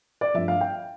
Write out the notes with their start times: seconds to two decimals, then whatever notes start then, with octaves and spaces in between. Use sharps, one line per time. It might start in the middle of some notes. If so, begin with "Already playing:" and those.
0.21 D5
0.33 G2 F3 A3 E5
0.48 F5
0.61 G5